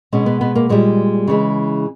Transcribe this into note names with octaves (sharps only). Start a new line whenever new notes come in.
B2 G#3 C#4
B3
B3
A#3
A#2 G3 G#3
C#3 E3 G#3